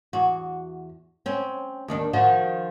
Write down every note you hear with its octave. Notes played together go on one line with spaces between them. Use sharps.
E2 F#4
C4 C#4
D#2 D#3 D4
D#3 F3 F#4